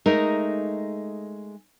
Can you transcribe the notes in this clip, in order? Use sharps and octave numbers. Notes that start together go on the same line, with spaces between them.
G#3 A3 D#4 A#4